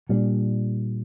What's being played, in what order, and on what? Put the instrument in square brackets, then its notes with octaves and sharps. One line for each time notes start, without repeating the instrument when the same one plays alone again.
[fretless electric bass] A#2 G3 B3 D4